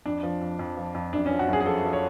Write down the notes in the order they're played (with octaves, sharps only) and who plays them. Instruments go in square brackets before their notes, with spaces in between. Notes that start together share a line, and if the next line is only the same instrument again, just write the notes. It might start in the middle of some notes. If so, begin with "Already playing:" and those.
[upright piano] F2 D4
F3
F2
F2
F3
F2
F#2 D4
C#4
F3
F#4
F#2 G#4
G#4
F3 A4
F3
C#5